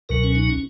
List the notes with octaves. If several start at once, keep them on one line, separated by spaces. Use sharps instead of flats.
C#2 B2 F#3 A#4
C#4
D#4
C#4